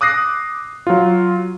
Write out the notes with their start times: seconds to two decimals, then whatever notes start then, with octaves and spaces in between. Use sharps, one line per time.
0.01 D6 D#6 F#6 A#6 C7
0.87 F#3 F4